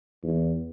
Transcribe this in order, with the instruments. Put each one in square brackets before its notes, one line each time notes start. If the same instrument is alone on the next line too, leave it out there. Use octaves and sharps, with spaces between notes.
[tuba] E2